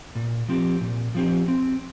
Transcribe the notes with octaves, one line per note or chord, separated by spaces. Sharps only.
A#2
F3 C4 G4
A#2
F3 C4 G4
C4